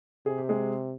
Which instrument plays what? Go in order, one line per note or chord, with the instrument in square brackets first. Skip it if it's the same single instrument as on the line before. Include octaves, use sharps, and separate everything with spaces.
[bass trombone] C3 [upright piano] G#4
[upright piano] G4
G#3 G#4